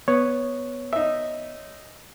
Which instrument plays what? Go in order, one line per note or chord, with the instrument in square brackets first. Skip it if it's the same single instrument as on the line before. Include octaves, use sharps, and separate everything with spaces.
[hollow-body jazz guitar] B3 [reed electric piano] C#5
[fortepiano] D#4 E5